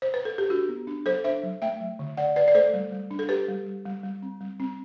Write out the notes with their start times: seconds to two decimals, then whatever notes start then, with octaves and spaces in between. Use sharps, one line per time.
0.02 C5
0.14 B4
0.25 A4
0.38 G4
0.50 D4 F#4
0.69 B3
0.87 D4
1.05 F#3 A4 C5
1.24 D4 C5 E5
1.43 F#3
1.62 A3 E5 G5
1.81 F#3
1.99 D3
2.17 D3 D5 F#5
2.36 D3 B4 D5
2.48 D5
2.55 A3 A4 C5
2.74 G3
2.92 G3
3.11 D4
3.19 A4
3.29 D4 G4 B4
3.48 G3
3.66 G3
3.85 G3
4.03 G3
4.22 C4
4.41 G3
4.60 C4